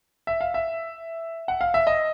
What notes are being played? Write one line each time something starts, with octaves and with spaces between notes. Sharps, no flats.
E5
F5
E5
F#5
F5
E5
D#5